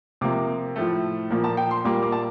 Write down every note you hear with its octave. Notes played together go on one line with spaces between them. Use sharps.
C3 F3 A#3 D6
A2 F3 A3
A#2 F3 A#3
A5
G5
C6
A#2 G3 A#3 D6
D6
A5